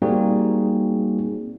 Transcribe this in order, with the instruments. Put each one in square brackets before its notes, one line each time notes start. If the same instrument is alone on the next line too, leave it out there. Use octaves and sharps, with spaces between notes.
[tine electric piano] G3 A#3 C4 D#4 F#4 G#4